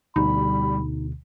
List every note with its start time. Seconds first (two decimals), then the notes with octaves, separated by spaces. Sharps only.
0.16 D2 B2 D3 G3 D#4 B5